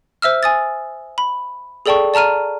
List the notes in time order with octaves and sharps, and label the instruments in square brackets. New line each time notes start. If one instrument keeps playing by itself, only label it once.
[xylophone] C5 E5 E6 F6
G#5 D#6 A6
B5
G#4 A4 D5 G5 A5 C#6
D5 A5 A#5 F6 D#7